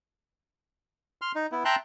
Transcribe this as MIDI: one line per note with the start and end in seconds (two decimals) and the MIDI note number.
1.22 1.32 84
1.22 1.32 89
1.35 1.46 63
1.52 1.63 59
1.52 1.63 64
1.65 1.76 76
1.65 1.76 79
1.65 1.76 81
1.65 1.76 82
1.65 1.76 84
1.65 1.76 90